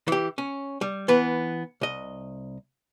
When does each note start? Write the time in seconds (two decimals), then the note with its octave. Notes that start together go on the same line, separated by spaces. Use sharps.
0.08 E3 G4
0.38 C#4
0.81 G3
1.08 E3 B3 B4
1.81 C2 D#5